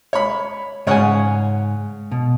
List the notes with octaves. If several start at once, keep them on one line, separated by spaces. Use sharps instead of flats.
C#5 B5
G#2 C#3 C#5 F#5 G#5
B2